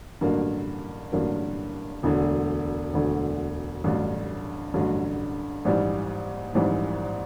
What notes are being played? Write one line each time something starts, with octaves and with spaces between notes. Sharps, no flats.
A1 G2 D3 F#3 A#3
A1 G2 D3 F#3 A#3
E1 D2 D3
E1 D2 D3
A1 G2 D3 F#3
A1 G2 D3 F#3
A#1 G#2 E3 G3
A#1 G#2 E3 G3